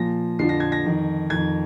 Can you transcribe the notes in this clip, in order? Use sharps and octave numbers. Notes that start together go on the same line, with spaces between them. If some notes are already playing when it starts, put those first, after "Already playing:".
Already playing: A#2 F3 A#6
F2 D3 F3 C7
A#6
G#6
A#6
F2 D#3
F2 D#3 G#6